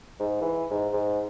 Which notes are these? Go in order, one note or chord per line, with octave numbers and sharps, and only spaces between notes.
G#2
E3
G#2
G#2